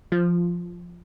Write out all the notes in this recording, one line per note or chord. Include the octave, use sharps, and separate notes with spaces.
F3